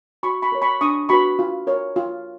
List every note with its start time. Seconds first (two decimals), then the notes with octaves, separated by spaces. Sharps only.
0.23 F#4 B5 C#6
0.42 B5 C#6
0.52 A#4 C#5
0.62 B5 C#6
0.81 D4 C#6 D#6
1.09 F#4 B4 B5 C#6
1.39 F4
1.67 A#4 C#5
1.96 F4